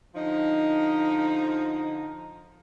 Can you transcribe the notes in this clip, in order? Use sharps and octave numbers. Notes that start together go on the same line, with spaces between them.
D3 F3 D#4